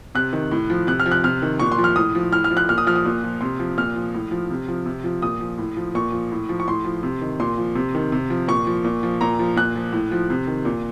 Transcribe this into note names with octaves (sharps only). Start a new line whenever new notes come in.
C3 F#6
D#3
A2
F3
C3 F#6
F6
F3
F#6
C3 F6
D#3
A#2 C#6
C6
F3
F6
A2 D#6
F3
A2 F6
F6
F3
F#6
A#2 F6
D#6
F3 F6
D#6
A#2
F3
C3 C6
F3
A#2 F6
F3
A2
F3
C3
F3
C3
F3
A#2 D#6
F3
A2
F3
A#2 C#6
F3
A2
F3
C#6
A2 C6
F3
C3
D#3
A#2 C6
F3
C3
D#3
C3
F3
A#2 C#6
F3
A#2
F3
A#2 A#5
F3
A#2 F#6
F3
A2
F3
C3
D#3
A#2